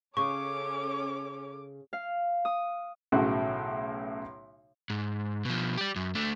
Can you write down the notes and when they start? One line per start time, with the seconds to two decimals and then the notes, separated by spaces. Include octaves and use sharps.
0.17 C#3 C#4 A4 C#5 C#6 D6
1.93 F5
2.45 D#6
3.12 B1 A2 C#3 F#4
4.90 G#2
5.45 B2 F3
5.77 G4 D5
5.96 F#2
6.15 A3 D4